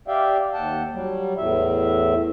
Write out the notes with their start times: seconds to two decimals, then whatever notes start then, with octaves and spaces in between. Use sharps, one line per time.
0.08 G4 D5 E5 F5 G5
0.54 D#2 F#5 G5 A5
0.92 F#3 G3
1.37 E2 A2 E5